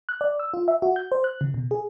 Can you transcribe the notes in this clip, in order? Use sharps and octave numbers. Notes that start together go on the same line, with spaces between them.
F#6
D5
E6
F4
E5
F#4
G6
C5
F#6
C#3
B2
G#4